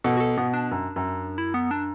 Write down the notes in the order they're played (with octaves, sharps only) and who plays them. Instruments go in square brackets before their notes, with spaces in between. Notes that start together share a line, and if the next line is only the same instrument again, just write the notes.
[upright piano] B2 [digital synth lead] A4
[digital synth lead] F#4
A4
[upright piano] B2 [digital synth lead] B3
[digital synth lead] D4
[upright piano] F#2
F#2
[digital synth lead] E4
B3
D4